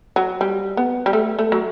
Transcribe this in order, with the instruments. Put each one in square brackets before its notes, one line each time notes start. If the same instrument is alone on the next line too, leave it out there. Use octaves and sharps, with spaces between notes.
[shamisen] F#3
G3
B3
G3
A3
A3
F#3